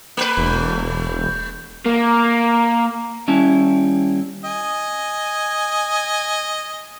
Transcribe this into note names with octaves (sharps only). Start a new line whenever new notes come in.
A3 B4
E1
A#3
D#2 G3 C#4 E4 A5
D#5 G#5